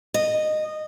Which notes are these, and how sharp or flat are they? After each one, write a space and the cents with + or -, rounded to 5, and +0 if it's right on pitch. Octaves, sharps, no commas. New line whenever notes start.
D#5 -15